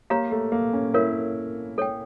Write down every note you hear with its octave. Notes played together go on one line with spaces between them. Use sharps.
A#3 G4 C#5 F5 A#5
A3
A#3
C#4
E4 A#4 C#5 F5
A4 C#5 G5